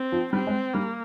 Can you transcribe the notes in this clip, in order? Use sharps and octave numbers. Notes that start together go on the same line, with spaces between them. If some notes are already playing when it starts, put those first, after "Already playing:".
Already playing: C4
F3
G3 C4
G#3
G3 A#3